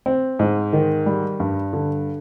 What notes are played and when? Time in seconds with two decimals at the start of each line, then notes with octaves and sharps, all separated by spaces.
0.06 C4
0.39 G#2
0.73 D#3
1.06 G3
1.40 G2
1.73 D3